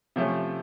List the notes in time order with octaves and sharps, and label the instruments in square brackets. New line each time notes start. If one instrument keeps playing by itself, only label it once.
[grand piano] C3 F3 A3 C#4